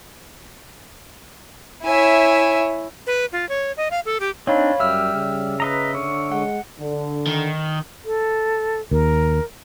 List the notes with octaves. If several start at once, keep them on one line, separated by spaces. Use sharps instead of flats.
E4 C#5 E5 G#5
B4
F4
C#5
D#5
F5
A4
G4
C4 D4 D#4 C#5 F5 B5
F#2 G3 E5 E6 F6
C#3
B4 D#5 A#5
D3 C#5
G#3 F#5
D3
D#3
A4
D#2 A#4